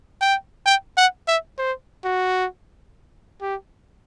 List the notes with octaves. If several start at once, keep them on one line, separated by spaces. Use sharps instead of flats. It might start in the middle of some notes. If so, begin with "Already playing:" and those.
G5
G5
F#5
E5
C5
F#4
G4